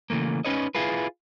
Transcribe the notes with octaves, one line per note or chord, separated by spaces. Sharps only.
C#3 E3 A3 A#3
C#4 D#4 B4 C#5 D#5
E4 F4 G#4 B4